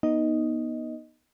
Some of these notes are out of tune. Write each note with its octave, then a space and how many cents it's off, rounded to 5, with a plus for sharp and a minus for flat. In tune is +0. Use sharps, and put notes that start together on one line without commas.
B3 -25 D#4 +0 D#5 +0